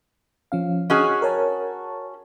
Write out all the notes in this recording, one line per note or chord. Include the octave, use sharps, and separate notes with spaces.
F3 C#4 F5
C#4 F#4 G#4 D#5 D#6 F6
A#4 C#5 A5